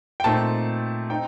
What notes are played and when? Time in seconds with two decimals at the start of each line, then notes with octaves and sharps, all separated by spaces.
0.20 G5
0.24 A#2 A3 C4 D#4 A5
1.10 C4 D#4 G5